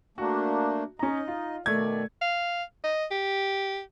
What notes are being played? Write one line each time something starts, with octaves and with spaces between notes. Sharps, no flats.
A3 A#3 D4 F#4
C#4 D#4 D#5 A#5
F4
B2 D#3 A3 D5 G#6
F5
D#5
G4